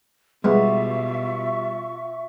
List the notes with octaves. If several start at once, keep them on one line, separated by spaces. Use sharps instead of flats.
B2 G3 G#3 B3 F4 E5 C#6